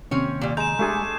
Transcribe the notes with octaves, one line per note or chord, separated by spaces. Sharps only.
D#2 C3 C4 C#4 C#5
A#2 G3
G#3 A#5 G6 E7
G#3 A3 D4 G4 G#4 G#5